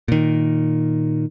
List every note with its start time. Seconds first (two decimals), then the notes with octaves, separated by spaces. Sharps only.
0.08 A#2 D#3